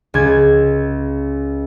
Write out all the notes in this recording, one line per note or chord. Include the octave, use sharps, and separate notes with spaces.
C#2 G#6